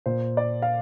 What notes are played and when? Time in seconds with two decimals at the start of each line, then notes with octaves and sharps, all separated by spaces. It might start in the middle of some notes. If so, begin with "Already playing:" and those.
0.06 A#2 C5
0.37 D5
0.62 F5